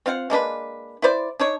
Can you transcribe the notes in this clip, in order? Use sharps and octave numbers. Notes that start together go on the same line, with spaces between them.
C4 F4 F5 F#5
G#3 A#3 D4 B4
E4 B4 C5 D5
D4 D#4 C#5